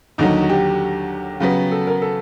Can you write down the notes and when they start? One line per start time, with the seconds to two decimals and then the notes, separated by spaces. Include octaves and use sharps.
0.18 D#2 D3 F#3 D#4
0.42 F#4
0.50 G4
1.40 C#3 F#3 B3
1.72 A4
1.87 A#4
2.02 A4